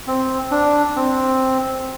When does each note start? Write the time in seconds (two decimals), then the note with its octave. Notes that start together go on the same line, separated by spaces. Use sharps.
0.07 C4
0.51 D4
0.96 C4